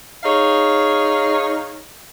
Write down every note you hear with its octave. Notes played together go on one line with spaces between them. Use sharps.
D#4 G#4 C#5 D#5 F5